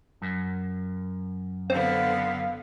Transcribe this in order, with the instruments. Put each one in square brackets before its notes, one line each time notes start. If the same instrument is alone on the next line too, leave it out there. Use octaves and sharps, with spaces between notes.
[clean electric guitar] F#2
[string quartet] D3 B3 [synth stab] C4 [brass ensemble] F5